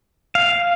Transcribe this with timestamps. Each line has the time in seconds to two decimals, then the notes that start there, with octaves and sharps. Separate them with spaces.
0.35 F5